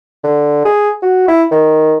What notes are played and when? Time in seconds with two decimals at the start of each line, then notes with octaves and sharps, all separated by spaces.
0.24 D3
0.65 G#4
1.02 F#4
1.28 E4
1.51 D#3